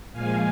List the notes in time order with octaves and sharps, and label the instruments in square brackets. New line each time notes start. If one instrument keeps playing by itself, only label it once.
[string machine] A#2 F3 G#3 F5 G#5